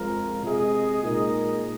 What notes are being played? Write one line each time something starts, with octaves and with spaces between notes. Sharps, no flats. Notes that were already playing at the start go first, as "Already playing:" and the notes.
Already playing: F2 F3 G#3 F4 A#4
C3 G#3 F4 G#4 D#5
A#2 G#3 D#4 A#4 D#5